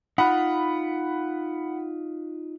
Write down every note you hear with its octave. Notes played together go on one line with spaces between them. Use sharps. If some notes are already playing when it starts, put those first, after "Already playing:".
D#4 F4 F#5 B5